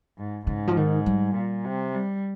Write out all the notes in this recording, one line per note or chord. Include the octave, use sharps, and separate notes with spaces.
G#2
G#2 C#3
F3
D#3
G3
A#2
C3
G3